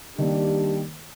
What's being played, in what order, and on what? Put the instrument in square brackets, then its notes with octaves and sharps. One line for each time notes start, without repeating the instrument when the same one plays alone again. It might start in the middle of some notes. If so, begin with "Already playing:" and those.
[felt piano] D#3 A#3 [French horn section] G3 D4 G4